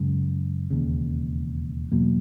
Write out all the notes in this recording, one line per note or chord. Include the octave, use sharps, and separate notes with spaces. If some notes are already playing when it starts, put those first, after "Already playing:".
Already playing: F#2 C#3 G#3
E1 D#2 C#3
E2 B2 F#3 A#3